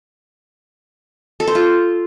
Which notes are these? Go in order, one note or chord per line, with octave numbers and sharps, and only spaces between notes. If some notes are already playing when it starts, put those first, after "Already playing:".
A4
C5
F4